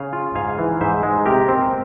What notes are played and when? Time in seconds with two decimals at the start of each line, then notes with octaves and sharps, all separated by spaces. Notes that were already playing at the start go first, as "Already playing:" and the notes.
Already playing: C#3 F5 G#5
0.13 F4
0.35 G#2 F5 G#5
0.58 E3
0.81 G#2 C5 E5
1.03 G#3
1.26 C3 G4 A#4
1.49 C4